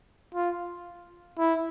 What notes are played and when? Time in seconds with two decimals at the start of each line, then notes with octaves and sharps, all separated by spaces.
0.35 F4
1.38 E4